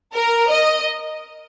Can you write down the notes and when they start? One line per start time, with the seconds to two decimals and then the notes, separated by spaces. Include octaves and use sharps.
0.15 A#4
0.51 D#5